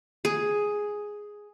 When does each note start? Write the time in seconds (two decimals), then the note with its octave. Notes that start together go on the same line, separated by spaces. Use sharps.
0.25 G#4